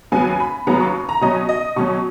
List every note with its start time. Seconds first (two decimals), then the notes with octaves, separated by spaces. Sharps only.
0.12 D#2 C#3 F#3 B3 G#5
0.40 B5
0.67 D#2 C#3 F#3 B3 A#5
0.80 C#6
1.09 A#5
1.21 B2 F#3 C#4 D#5
1.49 D#5
1.76 B2 F#3 C#4 C#6